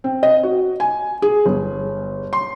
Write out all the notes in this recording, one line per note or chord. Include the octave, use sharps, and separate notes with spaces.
C4
D#5
F#4
G#5
G#4
G1
C6